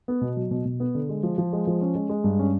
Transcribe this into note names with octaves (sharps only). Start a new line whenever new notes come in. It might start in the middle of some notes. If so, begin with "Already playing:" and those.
B3
B2
F#3
B2
B2
B3
D3
G#3
F3
F3
G#3
F3
C#4
G#3
G#3
G2
C#4